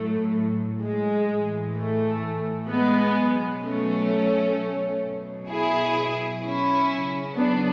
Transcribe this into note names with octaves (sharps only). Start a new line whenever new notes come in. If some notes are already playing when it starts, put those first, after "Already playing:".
Already playing: A2 F#3 A3
G#3
A2 E3
A3
G#3 B3
B2 F#3
A3 C#4
B2 F#3
E4 G#4
C#4 E4
C#3 F#3
B3 D4